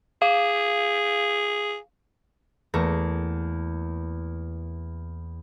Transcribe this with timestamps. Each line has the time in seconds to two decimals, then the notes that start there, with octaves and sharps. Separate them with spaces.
0.22 G#4 F5
2.74 E2 A3 A#3 A#6